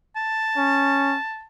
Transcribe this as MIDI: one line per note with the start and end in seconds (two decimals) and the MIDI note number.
0.16 1.45 81
0.57 1.16 61